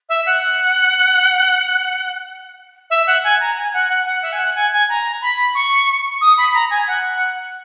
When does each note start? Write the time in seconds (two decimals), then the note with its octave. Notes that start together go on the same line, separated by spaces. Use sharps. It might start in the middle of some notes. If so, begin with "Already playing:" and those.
0.09 E5
0.25 F#5
2.90 E5
3.07 F#5
3.23 G#5
3.40 A#5
3.56 G#5
3.73 F#5
3.89 F#5
4.05 F#5
4.22 E5
4.32 G#5
4.38 F#5
4.55 G#5
4.72 G#5
4.89 A#5
5.21 B5
5.55 C#6
6.21 D#6
6.37 B5
6.54 A#5
6.70 G#5
6.87 F#5